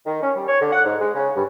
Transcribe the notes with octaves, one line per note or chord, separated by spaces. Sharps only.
D#3
C#4
G3
C#5
D3
F#5
G#2
G#3
C#3
G2